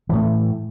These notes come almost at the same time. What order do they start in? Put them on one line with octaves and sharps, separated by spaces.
E3 A2 A3